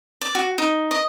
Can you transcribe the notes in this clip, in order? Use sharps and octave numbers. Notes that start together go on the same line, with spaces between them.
D5
F#4
D#4
D#5